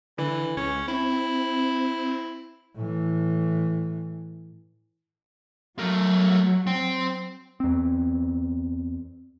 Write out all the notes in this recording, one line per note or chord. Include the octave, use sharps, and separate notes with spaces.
D3 E3
C#2 C#4
C4 E4
A2 E3
F#3 A3 A#4
C4
E2 C4